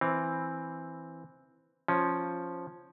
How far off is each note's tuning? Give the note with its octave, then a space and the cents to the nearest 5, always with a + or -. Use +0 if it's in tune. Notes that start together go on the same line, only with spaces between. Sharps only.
E3 +0 C4 +5 A#5 +0
F3 +0 C#4 -5